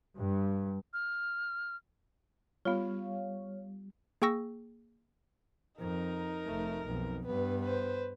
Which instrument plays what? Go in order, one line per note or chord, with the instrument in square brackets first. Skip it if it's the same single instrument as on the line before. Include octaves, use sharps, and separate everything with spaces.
[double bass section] G2
[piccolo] F6
[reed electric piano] G3 [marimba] B3 F4 [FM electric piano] C#5 F5
[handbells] A#3 G#4 G5 C#6 E6 A#6
[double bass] F2 [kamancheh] D#4 A#4
[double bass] F1 A3
B1 F2
[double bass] G2 B3 [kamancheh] B4
[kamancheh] B4 C5